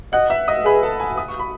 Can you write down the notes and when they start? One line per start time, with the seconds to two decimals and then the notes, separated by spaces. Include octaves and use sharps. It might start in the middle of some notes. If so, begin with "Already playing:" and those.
0.13 D#5 F#5 F#6
0.30 E5 E6
0.48 D#5 D#6
0.65 G#4 B4 B5
0.83 A4 A5
1.00 G#5
1.17 D#6
1.28 C#6
1.39 B5